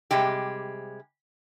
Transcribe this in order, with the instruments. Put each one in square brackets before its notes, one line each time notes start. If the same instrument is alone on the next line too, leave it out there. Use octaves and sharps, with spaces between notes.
[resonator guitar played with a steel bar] C3 G3 G#3 G4